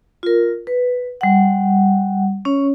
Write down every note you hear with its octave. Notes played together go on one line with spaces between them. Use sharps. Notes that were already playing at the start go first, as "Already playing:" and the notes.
F4 A#4
B4
G3 F#5
C#4 C#5